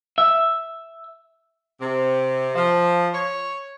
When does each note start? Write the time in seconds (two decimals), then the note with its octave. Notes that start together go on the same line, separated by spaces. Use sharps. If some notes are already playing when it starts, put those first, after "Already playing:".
0.18 E5
1.81 C3
2.55 F3
3.14 C#5